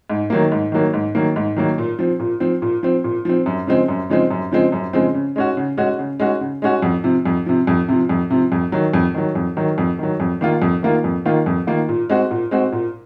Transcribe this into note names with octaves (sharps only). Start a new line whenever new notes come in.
G#2
D#3 F#3 A#3
G#2
D#3 F#3 A#3
G#2
D#3 F#3 A#3
G#2
D#3 F#3 A#3
A#2
F3 C4
A#2
F3 C4
A#2
F3 C4
A#2
F3 C4
F#2
C#3 F3 G#3 C4
F#2
C#3 F3 G#3 C4
F#2
C#3 F3 G#3 C4
F#2
C#3 F3 G#3 C4
C#3
G#3 C#4 F#4
C#3
G#3 C#4 F#4
C#3
G#3 C#4 F#4
C#3
G#3 C#4 F#4
F2
C3 F3
F2
C3 F3
F2
C3 F3
F2
C3 F3
F2
D#3 F#3
F2
D#3 F#3
F2
D#3 F#3
F2
D#3 F#3
F2
D#3 A#3 F4
F2
D#3 A#3 F4
F2
D#3 A#3 F4
F2
D#3 A#3 F4
A#2
G#3 C4 F#4
A#2
G#3 C4 F#4
A#2